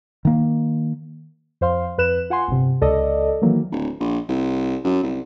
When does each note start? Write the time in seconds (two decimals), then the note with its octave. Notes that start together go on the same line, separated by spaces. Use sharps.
0.25 D#3 A#3
1.61 F2 C5 F5 C6
1.98 F2 B4 F#6 E7
2.30 F4 F#5 G#5 C6
2.48 G1 C3
2.81 C#2 A4 D5 D#5
3.42 D#3 E3 F#3 A#3
3.72 D1
4.00 A#1
4.29 C2
4.85 F#2
5.03 C2